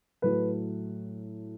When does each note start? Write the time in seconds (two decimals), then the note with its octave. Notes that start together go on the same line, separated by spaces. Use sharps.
0.22 A2 F#3 A3 B4